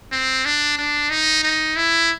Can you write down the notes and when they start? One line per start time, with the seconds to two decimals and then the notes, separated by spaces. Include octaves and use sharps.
0.12 C4
0.45 D4
0.78 D4
1.10 D#4
1.43 D#4
1.76 E4